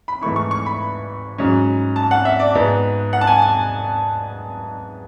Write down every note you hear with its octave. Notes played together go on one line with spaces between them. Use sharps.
B5
G#2 E3 A3 E4 C#6
C#6
C#6
B5
G#2 F#3 C#4
A5
F#5
E5
D5
G#2 G#3 B3
F#5
A5
G#5
A5